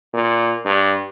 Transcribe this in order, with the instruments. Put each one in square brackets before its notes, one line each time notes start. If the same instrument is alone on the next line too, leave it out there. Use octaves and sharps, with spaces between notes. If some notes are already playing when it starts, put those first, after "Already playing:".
[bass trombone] A#2
G2